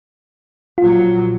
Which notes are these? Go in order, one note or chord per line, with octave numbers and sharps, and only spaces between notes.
A#2 F3 F#3 F4